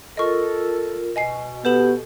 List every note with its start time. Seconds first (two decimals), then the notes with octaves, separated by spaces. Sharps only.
0.17 F4 A4 A#4 D#5 C#6
1.16 B2 D#5 G#5 C7
1.65 B3 G4 A4 E7 F#7